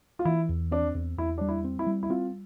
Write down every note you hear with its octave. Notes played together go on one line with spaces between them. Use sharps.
F4
E3 E4
E2
C4 D4
E2
E2 E4
G3 D4
E4
C4
E4
G3
E4
C4 F4